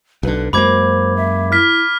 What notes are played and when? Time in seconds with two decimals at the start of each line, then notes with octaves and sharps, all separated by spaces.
0.23 B1 D3 B4
0.53 F#2 G#3 A#3 C5 B5 D6 G#6
1.16 E5
1.52 E4 F6 B6